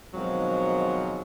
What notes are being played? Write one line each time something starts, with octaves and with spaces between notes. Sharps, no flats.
B2 D#3 F3 F#3 G#3 C4